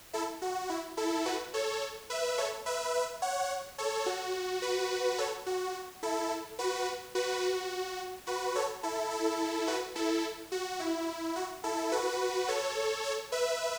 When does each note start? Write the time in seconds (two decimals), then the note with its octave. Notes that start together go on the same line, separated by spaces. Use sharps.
0.13 E4 A4
0.42 F#4
0.70 E4
0.97 E4 A4
1.26 F#4 B4
1.54 A4 C#5
2.10 B4 E5
2.38 A4 C#5
2.66 B4 E5
2.94 B4 E5
3.22 C#5 F#5
3.78 A4 C#5
4.06 F#4
4.62 F#4 B4
5.18 A4 C#5
5.46 F#4
6.03 E4 A4
6.59 F#4 B4
7.15 F#4 B4
7.43 F#4
8.27 F#4 B4
8.55 A4 C#5
8.83 E4 A4
9.11 E4 A4
9.67 F#4 B4
9.95 E4 A4
10.52 F#4
10.80 E4
11.36 F#4
11.64 E4 A4
11.92 F#4 B4
12.48 A4 C#5
13.04 A4 C#5
13.32 B4 E5